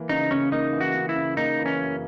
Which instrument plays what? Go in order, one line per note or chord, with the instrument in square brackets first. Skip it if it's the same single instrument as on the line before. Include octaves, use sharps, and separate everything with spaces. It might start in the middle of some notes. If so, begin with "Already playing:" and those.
Already playing: [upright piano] E3 A#3
[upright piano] C#3 [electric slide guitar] D#4
[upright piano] C#3 [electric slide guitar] C#4
[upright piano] A#3 [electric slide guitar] D#4
[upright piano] E3
[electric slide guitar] F#4
[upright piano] C#3
[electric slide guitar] E4
[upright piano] C#3
[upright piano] A#3 [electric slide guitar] D#4
[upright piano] E3
[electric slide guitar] C#4
[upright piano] F#2